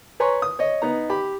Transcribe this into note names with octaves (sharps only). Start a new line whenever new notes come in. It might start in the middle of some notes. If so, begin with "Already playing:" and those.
B4 C#5 G#5 A#5 C6 C#6
D#6
C#5 D#5
B3 D#4 A#5
G4 B5